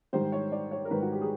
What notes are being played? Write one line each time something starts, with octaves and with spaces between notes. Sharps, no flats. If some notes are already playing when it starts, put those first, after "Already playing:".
G#2 D#3 G3 C5
C#5
D5
C#5
A#4
G#2 D#3 G3 B4
F#4
G4
G#4